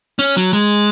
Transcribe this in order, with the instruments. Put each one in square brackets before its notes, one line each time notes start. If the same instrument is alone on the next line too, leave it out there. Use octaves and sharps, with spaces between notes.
[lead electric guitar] C#4
F#3
G#3